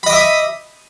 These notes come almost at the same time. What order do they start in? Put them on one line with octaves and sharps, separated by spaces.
B5 D#5 D6 E5 D#6